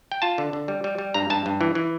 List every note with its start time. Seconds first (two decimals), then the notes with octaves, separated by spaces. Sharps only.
0.12 G5
0.22 F4 A5
0.38 D3
0.53 D3
0.68 G3
0.84 G3
0.99 G3
1.14 G2 A#5
1.30 G2 A5
1.46 G2
1.61 E3
1.75 E3